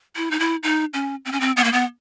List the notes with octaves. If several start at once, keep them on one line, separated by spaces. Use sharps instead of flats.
E4
D#4
E4
D#4
C#4
C4
C#4
C4
B3
A#3
B3